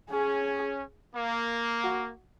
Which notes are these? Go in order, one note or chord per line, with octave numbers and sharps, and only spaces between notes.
C#4 G#4
A#3
F#4